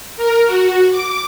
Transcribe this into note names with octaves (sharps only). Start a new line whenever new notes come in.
A#4
F#4
D6